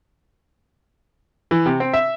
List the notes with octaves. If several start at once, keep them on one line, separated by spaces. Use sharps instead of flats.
E3
C3
C4
E5